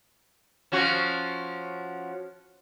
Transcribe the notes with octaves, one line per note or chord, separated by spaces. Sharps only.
F3 C#4 F#4